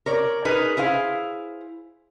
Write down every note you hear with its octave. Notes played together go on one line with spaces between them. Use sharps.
A#4 C#5 D5
D#4 G#4 A#4 B4
E4 G#4 C5 F5